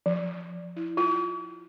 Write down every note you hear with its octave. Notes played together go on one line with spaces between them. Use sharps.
F3
E4
F4